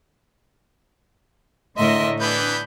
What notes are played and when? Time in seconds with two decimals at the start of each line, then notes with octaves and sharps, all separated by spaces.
1.77 A2 D3 A#4 D#5 E5 C6
2.20 E3 B3 D4 B5 G6